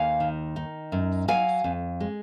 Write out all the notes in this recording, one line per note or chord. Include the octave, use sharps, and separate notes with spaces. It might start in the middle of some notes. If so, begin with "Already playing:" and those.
Already playing: D#2 F5 G#5
D#3
D#4
F#2
F#3 F5 G#5
F2
G#3